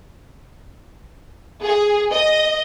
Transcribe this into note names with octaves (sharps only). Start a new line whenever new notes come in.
G#4
D#5